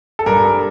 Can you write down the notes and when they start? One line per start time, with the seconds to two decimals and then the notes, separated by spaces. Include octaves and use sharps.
0.19 A4
0.26 G2 A#4